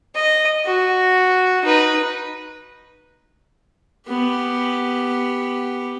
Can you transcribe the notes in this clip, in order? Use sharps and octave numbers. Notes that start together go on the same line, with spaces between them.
D#5
F#4
D#4 B4
B3 G4